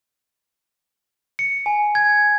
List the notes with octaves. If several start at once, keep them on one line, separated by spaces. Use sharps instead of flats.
C#7
G#5
G#6